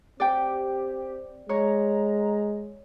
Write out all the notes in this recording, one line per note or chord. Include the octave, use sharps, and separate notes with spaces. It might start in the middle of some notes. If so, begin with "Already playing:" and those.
C4 G4 D5 G5
G#3 C#5 A#5